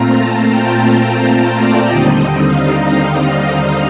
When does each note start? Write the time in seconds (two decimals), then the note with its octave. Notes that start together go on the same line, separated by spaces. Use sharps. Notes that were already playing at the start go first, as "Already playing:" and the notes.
Already playing: A#2 A3 C4 F4 A#5
0.19 A5
0.48 G5
1.60 D5
1.87 D#2 D3 G3 C4 D#4 D#5
2.44 F5
2.72 A#5